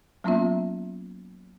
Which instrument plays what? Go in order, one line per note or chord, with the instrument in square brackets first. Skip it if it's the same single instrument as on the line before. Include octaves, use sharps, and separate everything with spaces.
[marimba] F#3 A#3 B3 C#4 F4 E5